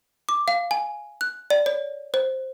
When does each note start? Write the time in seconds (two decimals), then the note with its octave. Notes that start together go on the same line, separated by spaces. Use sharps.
0.29 D6
0.48 F5
0.71 G#5
1.21 F#6
1.50 D5
1.66 C#5
2.14 C5